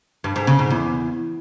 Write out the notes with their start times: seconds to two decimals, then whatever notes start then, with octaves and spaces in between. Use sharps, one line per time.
0.24 G2
0.36 G#2
0.47 C#3
0.59 G#2
0.70 E2